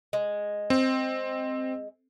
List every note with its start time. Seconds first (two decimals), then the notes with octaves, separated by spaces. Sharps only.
0.13 G#3
0.70 C4